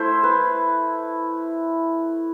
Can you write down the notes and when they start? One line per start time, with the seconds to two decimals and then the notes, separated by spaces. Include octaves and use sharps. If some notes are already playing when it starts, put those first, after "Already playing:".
Already playing: A3 E4 C5
0.23 B4